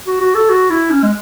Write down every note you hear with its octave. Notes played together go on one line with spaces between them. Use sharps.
F#4
F#4
A4
F#4
E4
C#4
G#3